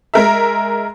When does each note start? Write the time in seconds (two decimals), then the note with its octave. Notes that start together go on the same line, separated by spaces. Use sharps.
0.14 G#3 A#4 E5